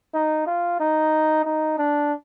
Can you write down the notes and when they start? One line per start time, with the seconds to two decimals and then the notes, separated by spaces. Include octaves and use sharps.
0.14 D#4
0.47 F4
0.80 D#4
1.45 D#4
1.78 D4